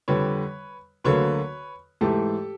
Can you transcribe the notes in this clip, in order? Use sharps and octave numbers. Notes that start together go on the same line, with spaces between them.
F2 D3 G3 B4 C#5
D2 D3 F#3 A#3 B4 C#5
G#2 E3 A3 G4 A4